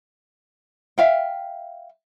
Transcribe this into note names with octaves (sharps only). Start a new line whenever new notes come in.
E5 F5 G5